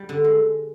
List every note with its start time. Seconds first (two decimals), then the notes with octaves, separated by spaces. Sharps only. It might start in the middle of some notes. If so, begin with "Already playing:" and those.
Already playing: G3
0.09 D3
0.24 G#3